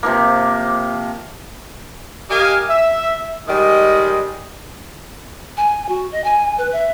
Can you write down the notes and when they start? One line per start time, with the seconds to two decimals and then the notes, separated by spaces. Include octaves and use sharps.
0.03 C3 F3 A#3
2.30 G4 A#4 D#5 F5 G#5
2.70 E5
3.47 D#3 G3 G#3 D#5
5.57 G#5
5.89 F#4
6.12 D#5
6.24 G#5
6.58 B4
6.72 E5